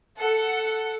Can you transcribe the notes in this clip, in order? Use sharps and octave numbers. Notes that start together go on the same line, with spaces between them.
A4 F#5